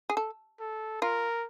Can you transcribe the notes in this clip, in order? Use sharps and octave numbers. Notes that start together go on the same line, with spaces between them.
G#4
A4
A4
F4 A#4